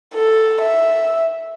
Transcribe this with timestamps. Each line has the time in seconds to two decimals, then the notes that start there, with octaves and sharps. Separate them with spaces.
0.14 A4
0.61 E5